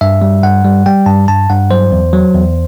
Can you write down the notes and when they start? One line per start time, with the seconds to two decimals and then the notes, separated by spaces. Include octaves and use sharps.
0.01 G2 E5
0.22 G3
0.43 G2 F#5
0.64 G3
0.86 G3 G5
1.06 G2 A5
1.28 G2 A5
1.50 G2 F#5
1.70 F#3 C5
1.92 E2
2.13 F#3
2.34 E2